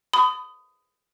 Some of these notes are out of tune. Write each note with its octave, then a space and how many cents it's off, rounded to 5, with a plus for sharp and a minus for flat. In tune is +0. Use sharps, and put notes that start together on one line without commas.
B5 +35 D#6 +0